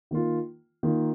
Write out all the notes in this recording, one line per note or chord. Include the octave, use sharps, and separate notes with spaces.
D#3 A#3 F4
D#3 A#3 F4